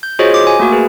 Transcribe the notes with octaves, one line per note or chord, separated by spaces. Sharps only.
G6
F4 F#4 G#4 C5 C#5 D#5
D6
G#5
A3 A#3 F#4 A#4
G#4 B4